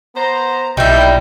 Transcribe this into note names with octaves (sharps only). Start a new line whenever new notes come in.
B3 C5 A#5
B1 A#2 G3 D#4 E4 G6